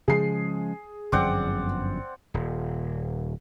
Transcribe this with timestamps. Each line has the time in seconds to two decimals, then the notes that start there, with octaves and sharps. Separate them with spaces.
0.08 C#3 F3 G#3 G#4 C7
1.12 G1 F#2 F3 C4 D5 F#5
2.34 D#1